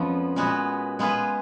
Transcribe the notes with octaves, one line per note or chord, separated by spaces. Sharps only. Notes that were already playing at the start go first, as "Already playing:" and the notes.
Already playing: F2 F3 G#3 B3 C#4
A#2 G#3 B3 F#4 B4
G#3 B3 F4 G#4 B4